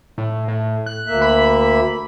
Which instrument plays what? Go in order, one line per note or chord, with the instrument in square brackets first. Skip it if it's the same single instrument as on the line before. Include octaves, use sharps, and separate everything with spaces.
[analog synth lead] A2
A2
F#6
[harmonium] D2 A#3 E5
[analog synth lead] B5